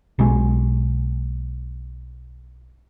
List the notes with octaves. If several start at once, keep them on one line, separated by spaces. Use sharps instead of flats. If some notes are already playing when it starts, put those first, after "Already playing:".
B1 G#3